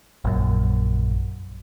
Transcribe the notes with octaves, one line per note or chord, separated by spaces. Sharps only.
A#1 F#2